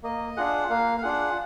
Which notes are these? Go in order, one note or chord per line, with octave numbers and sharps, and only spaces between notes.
A#3 D#5
D4 F4 G#4 F#5
A#3 F5
F5
D4 F4 G#4 F#5